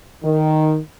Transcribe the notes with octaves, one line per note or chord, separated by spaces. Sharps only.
D#3